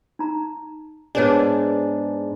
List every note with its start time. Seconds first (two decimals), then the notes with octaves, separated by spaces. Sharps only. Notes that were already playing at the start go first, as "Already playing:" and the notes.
0.19 D#4 A#5
1.15 G#2 B3 D4 G#4 B4 C#5 D5